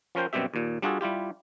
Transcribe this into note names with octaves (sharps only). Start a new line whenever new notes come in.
F3 C#4 A#4 C5 G5
F#2 B2 G3 C4 G4 E5
D#2 A#2
G3 D4 F4 F#4 G#4 A4
G3 E4 F4 G4